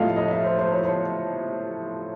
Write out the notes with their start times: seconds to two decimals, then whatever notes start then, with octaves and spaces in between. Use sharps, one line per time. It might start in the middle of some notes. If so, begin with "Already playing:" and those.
Already playing: A2 F3 A3 A4 D#5 F5
0.16 D#5
0.31 E5
0.44 C5
0.58 C5
0.72 C#5
0.85 C#5